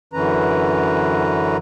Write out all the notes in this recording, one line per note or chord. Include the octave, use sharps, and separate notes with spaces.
F#2 D3 E3 C#4 B4 A#5